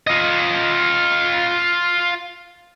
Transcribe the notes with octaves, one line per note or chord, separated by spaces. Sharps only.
F4 D#5